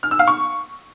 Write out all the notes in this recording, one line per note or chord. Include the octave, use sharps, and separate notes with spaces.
F6
E6
F5
C#6